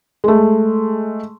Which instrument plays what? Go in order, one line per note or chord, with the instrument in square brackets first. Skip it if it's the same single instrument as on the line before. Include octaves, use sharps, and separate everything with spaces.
[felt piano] G#3 A3